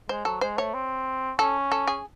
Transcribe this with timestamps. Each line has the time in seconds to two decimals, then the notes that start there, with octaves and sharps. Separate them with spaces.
0.09 G#3 C5
0.25 F#3 A4
0.41 G#3 C5
0.57 A3 C#5
0.74 C4
1.39 C#4 A4
1.72 A4
1.87 G#4